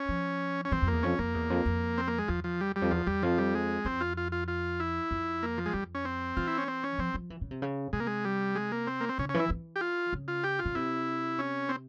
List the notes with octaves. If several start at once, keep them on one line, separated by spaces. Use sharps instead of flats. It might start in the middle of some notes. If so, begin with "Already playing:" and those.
Already playing: C#4
F3
C#4
E3 C4
F2
A#3
E2
F2 C#4
F2 A#3
E2
F2
F2
C4
A#3
G#3
E2 F3
F3
G3
G3
F2
E2 F3
E2 G3
F2 F3
G3
G#3
F2 C4
F4
F4
F4
F4
E4
F2
A#3
F3
G#3
F2 G3
C#4
C4
E3 F4
E4
C#4
C4
C#4
F3 C4
F3
E3
C#3
C3
C#3
C3 G#3
A#3
G#3
G3
G#3
A#3
C4
A#3
C4
C#3 C#4
C#4
E3 E4
E3
G4
F4
C#3
F4
G4
F4
C#3
C3 E4
C#4
C4